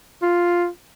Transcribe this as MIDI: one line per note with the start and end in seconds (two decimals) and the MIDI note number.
0.22 0.67 65